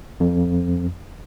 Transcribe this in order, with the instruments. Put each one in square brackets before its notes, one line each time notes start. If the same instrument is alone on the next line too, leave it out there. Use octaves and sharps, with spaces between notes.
[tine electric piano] F2